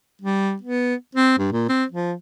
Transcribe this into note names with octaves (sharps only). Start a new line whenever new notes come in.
G3
B3
C4
G2
A#2
C4
F3